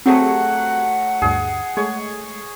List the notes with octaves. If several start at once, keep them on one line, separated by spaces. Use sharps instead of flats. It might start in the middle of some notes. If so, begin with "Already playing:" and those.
F#3 A3 C4 G4 G#4 F#5
D2 G2 G#4
G#3 A3 C#5